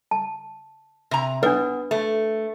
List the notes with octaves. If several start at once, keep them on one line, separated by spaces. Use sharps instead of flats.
A5
C3 A#5
B3 D4 B4
A3